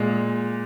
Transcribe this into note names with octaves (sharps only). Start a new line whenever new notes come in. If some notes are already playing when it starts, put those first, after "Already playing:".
Already playing: A#2 G#3